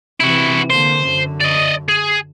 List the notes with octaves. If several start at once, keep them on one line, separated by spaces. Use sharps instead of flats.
C3 E3 E4 F#4
D3 A#3 C5
F#2 D3
D5 D#5
G#4